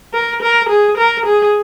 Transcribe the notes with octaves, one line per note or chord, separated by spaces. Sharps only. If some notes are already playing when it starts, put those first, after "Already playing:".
A#4
A#4
G#4
A#4
G#4